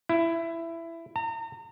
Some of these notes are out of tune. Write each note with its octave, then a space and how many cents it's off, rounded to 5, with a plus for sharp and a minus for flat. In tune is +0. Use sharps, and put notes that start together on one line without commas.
E4 +15
A#5 -35